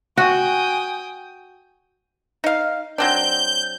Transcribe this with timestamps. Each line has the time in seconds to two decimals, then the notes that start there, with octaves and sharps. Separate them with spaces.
0.17 F#4 G5 G#5 D#6
2.44 D#4 F5
2.98 F#3 C4 D4 G6